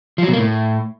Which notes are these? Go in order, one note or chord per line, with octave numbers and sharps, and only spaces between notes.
F3
F#3
B2
A#3
A2